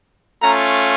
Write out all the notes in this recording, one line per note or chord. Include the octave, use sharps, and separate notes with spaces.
A3 C#4 F4 A#5